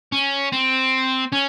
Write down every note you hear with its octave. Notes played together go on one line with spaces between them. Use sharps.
C#4
C4
C#4